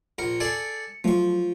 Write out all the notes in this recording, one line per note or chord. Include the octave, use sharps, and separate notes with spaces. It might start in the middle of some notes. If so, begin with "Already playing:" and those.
A#1 A#4 C#7
G#4 A4 D5
F3 F#3 A3 C#6